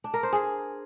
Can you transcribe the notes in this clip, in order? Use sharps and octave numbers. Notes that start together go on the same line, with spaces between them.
D4
A#4
C5
G#4